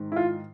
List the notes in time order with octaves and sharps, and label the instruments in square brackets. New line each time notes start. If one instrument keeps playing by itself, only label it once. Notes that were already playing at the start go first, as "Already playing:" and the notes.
Already playing: [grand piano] G#2 D#3
E4
F4